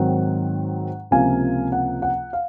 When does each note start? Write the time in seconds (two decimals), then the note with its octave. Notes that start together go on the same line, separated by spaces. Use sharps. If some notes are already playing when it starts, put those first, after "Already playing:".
Already playing: G#2 D#3 F#3 C4 D#4 F#5
1.11 C#2 C3 F3 A#3 F5 G#5
1.72 F#5
2.02 F#5
2.33 F5